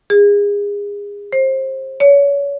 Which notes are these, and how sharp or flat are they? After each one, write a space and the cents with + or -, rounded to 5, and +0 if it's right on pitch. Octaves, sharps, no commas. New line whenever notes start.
G#4 -30
C5 +25
C#5 +30